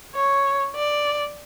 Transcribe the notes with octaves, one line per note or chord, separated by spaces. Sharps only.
C#5
D5